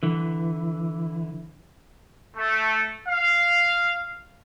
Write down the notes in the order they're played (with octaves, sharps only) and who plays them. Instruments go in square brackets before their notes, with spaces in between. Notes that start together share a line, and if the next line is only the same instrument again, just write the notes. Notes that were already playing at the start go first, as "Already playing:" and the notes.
[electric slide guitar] D3 E3
[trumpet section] A3
F5